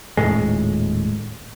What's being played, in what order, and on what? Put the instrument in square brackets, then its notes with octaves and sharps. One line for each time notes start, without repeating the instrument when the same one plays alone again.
[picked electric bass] D#1 E2 A2 G#3